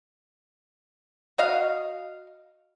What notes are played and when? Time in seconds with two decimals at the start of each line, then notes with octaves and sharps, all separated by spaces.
1.38 F#4 D#5 F5